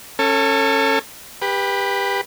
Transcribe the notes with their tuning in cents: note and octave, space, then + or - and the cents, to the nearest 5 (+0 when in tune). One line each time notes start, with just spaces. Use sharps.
C#4 -10 A4 +25
G4 +25 B4 -10